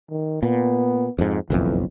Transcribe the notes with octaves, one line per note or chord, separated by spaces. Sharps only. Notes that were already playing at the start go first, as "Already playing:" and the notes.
D#3
A#2 B3
F2 G#2
F#1 B1 F2 E3